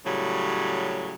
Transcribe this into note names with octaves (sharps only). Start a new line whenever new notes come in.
A2 C#3 F#3 G3